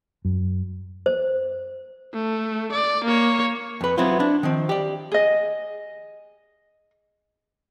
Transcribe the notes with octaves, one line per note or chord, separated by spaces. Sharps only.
F#2
C5
A3
D5
A#3 C#5
F2 B4
F#3 B3 C4 E4 F4
D4 E4
D#3 F3 C4
G4 D5
G#4 D#5